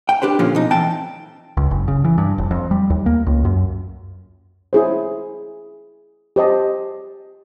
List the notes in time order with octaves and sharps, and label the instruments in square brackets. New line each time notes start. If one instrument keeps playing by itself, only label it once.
[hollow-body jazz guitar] G5
D4 G4 B4 C5
A#2 D3 F3 C#4 F4
B2 D#4
E3 C4 G5 A5
[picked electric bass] C#2
F#1
C#3
E3
G2
F1
F2
G3
D#2
A#3
C#2
F#2
[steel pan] E4 G#4 C5
G4 C5 D#5 A5